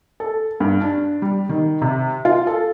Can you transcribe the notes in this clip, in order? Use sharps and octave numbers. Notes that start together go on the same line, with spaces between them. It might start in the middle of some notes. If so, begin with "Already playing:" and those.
A4
G2
D4
G3
D#3
C3
F4
A4